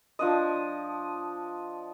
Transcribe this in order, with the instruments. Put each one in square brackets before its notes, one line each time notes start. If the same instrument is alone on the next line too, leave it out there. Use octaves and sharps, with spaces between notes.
[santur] F3 D4 D#5